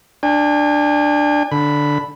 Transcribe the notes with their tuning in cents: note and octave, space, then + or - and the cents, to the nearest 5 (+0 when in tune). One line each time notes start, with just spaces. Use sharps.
D4 +10 G#5 -40
D3 +0 B5 +0